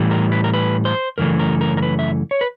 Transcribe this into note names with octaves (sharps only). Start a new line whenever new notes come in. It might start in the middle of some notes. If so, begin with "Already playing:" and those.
Already playing: A2 E3 G3
A#4
B4
A#4
B4
C5
F#2 C#3 E3 A3 A#4
A#4
A#4
A#4
B4
E5
C#5
B4